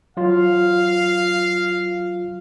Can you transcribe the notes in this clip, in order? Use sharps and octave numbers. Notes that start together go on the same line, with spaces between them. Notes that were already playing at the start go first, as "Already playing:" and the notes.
F#3 F4 F5